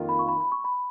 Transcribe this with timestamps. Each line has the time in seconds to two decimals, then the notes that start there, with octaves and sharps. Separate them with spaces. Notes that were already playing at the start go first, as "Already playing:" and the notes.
Already playing: F2 D#3 A#3 F4
0.09 B5
0.19 C#6
0.28 B5
0.40 B5
0.52 C#6
0.64 B5